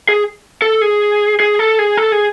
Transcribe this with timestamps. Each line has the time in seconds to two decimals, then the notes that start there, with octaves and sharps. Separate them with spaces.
0.09 G#4
0.62 A4
0.82 G#4
1.40 G#4
1.59 A4
1.79 G#4
1.97 A4
2.12 G#4